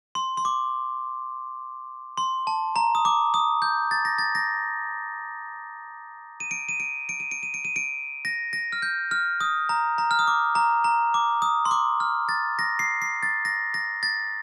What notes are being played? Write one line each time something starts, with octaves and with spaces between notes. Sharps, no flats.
C6
C6
D6
C6
A5
A#5
D#6
D6
D#6
G6
A6
A#6
A6
A#6
D#7
D7
D#7
D7
D7
D#7
D7
D#7
D7
D#7
D7
A#6
A#6
F6
G6
F6
D#6
A#5
A#5
F6
D#6
D6
A#5
A#5
D6
D#6
C6
D6
F6
A6
A#6
C7
C7
A6
A#6
A#6
A6